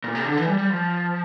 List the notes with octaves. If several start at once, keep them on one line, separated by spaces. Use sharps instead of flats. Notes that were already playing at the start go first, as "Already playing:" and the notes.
A#2
C3
D3
E3
G3
G3
F3